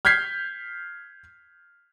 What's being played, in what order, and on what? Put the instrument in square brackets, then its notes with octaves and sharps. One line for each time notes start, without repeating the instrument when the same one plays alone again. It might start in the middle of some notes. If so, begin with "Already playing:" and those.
[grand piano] F6 G6 G#6 B6 C7